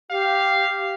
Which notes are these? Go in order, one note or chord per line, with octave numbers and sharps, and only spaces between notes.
G4 F5